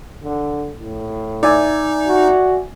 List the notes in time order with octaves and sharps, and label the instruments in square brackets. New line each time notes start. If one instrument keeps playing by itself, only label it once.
[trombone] D3
A2
[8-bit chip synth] D#4 [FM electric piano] D5 E5 G#5
[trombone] F#4